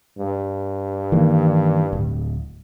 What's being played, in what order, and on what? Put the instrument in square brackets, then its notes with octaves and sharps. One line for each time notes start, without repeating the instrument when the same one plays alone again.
[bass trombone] G2
[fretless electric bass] D#3 E3 A#3
D1